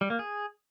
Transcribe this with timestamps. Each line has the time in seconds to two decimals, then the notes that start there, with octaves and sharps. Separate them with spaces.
0.01 G3
0.10 A#3
0.19 G#4